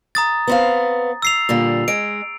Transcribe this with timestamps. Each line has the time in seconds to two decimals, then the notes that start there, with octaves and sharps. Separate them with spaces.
0.15 A#5 D#6 A6
0.47 B3 C4 F5
1.22 E6 C7 F7
1.49 A#2 D3 G3
1.88 G#3 D7